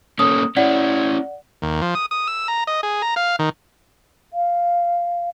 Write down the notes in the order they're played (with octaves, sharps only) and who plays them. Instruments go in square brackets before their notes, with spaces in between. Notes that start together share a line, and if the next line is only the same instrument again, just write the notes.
[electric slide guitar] A#3 C#4 A4 [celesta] D#6
[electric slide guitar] C#4 E4 [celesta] D5 F#5
[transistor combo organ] D#2
F3
D#6
D#6
E6
A#5
D#5
G#4
A#5
F5
D#3
[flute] F5